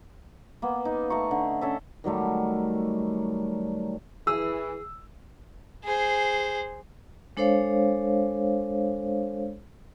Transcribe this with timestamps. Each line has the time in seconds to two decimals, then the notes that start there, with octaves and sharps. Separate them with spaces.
0.62 A#3 B3
0.85 D#4
1.10 A3 A#5 C#6
1.31 D3
1.61 C#4 A4 E5
2.04 D#3 F#3 G3 A3
4.27 E3 G#4 E6
5.84 G#4 C5
7.37 G#3 D4 A4 C5 C#5 F5